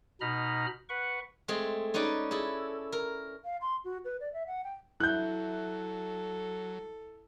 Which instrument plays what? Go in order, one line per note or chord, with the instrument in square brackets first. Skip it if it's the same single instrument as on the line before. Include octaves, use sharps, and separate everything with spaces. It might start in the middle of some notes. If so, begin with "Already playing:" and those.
[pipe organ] B2 D#4 A#5 B5 F6
B4 F#5 C#6
[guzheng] G#3 A3 C4 G#4
C#4 D#4 G#4 B4 D5
E4 G#4 A4
A#4
[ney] F5
C6
F#4
B4
D5
E5
F#5
G5
[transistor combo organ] F#3 [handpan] E4 [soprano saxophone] A4 [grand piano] F#6 G6